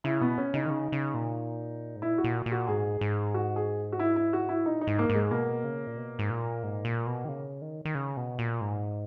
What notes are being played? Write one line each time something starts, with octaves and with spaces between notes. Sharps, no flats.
C#3 E4
B2 B3
C#4
C#3 D#4
D#3
C#3
C#3
A#2
G#2
A#2 E4
F#4
A#2
A#2
F#4
G#2 G#4
G#2
F#4
G#4
F#4
E4
E4
F#4
E4
A#2 D#4
D#4
G#2
A#3
G#2
G#3
B2 A#3
C#3
A#2
B2
G#2
A#2
G#2
A#2
B2
D#3
C#3
D#3
D#3
C#3
B2
A#2
G#2